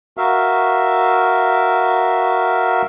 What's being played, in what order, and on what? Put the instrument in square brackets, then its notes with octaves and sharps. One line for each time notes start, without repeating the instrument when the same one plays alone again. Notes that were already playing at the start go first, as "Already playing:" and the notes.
[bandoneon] F#4 A#4 E5 F5